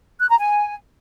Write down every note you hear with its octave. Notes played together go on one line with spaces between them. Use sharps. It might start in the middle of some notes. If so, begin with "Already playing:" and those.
F#6
A#5
G#5